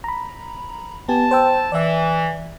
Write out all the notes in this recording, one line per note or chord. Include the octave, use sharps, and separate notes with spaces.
A#5 B5
B3 G4 G#5 A5
C5 G5 E6
E3 D5 E5